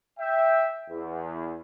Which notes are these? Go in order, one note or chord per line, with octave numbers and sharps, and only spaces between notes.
E5 G5
E2